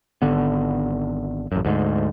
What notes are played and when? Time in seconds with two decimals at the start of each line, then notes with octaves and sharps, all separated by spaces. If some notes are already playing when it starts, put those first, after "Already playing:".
0.22 G#1 D3 B3
1.52 A1 F#2
1.65 D2 G#2